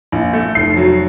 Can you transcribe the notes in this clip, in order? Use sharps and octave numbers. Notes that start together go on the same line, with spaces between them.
A#1
A3
F1 C7
F#3